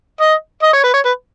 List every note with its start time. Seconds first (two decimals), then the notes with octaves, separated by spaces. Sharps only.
0.21 D#5
0.63 D#5
0.73 C#5
0.83 B4
0.94 C#5
1.05 B4